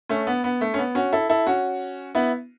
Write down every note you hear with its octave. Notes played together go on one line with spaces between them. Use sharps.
A3 C#4
B3
B3
A3
C#4
B3
C#4 F#4
E4 A4
E4 A4
C#4 F#4
B3 E4